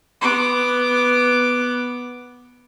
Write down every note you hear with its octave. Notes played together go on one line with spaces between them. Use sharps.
B3 D6